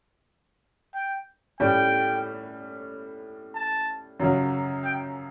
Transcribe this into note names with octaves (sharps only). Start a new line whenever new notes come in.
G5
A2 G3 C#4 G5
A5
F#2 C#3 F#3
G5